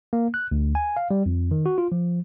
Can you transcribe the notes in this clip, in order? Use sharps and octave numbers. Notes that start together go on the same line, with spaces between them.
A#3
F#6
D2
G#5
F5
G3
F2
D#3
F#4
F4
F3